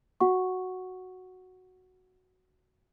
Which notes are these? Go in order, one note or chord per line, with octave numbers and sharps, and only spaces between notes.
F#4 F#5 C#6